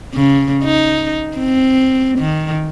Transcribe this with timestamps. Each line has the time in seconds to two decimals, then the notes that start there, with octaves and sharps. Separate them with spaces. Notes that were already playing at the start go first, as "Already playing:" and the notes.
0.14 C#3
0.64 D#4
1.38 C4
2.19 D#3